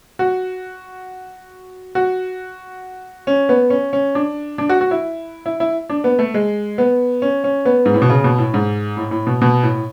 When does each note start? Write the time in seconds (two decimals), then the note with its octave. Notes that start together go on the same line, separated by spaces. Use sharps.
0.19 F#4
1.95 F#4
3.27 C#4
3.49 B3
3.70 C#4
3.93 C#4
4.15 D4
4.58 D4
4.69 F#4
4.81 F#4
4.91 E4
5.46 E4
5.60 E4
5.89 D4
6.04 B3
6.19 A3
6.34 G#3
6.78 B3
7.22 C#4
7.44 C#4
7.65 B3
7.85 G#2
7.94 A2
8.02 B2
8.10 C#3
8.24 B2
8.38 A2
8.54 G#2
8.97 A2
9.11 A2
9.27 B2
9.41 B2
9.63 A2